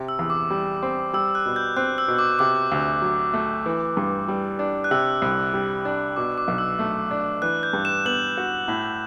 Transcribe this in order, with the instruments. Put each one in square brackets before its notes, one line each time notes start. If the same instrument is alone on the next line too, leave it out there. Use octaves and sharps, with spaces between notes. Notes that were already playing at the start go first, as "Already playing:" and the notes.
Already playing: [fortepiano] C3
[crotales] E6
[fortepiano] E2
[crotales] D6
[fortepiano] G3
C4
[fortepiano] G3 [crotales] E6
[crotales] F#6
[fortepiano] B2
[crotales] G6
[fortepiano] C4 [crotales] F#6
[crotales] E6
[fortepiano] B2
[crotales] D6
[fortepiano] C3 [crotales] D6
[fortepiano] D2
F#3
A3
E3
G2
G3
D4
[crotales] F#6
[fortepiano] C3 [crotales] E6
[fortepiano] C2
G3
D4
[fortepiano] B2 [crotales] D6
[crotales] D6
[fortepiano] B1
[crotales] E6
[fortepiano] A3
D4
[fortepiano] E3 [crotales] F#6
[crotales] G6
[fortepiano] G2
[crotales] E7
[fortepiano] B3 [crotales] F#7
[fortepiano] F#4
A2